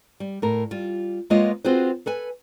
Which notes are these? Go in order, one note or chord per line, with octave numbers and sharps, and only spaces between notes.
G3
A2 A#4
G3 F4
G#3 A#3 B3 F4 C#5 D#5
C4 F4 F#4 G#4 B4 C5
A4 B4 G#5